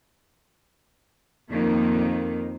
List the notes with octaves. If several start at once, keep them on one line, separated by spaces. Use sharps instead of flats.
F2 D#3 A#3